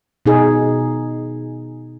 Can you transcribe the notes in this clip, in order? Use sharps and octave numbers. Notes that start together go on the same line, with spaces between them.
B2 D#4 G#4